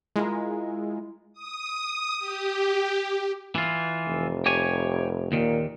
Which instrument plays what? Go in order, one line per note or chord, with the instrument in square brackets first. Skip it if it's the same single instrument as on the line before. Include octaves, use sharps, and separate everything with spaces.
[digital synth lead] G#3 [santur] E4 F4 A#4
[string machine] D#6
G4
[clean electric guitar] E3 F4
[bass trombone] F1
[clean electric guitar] G4 C#5 G#5
[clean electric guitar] D#2 D#3 [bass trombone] A#2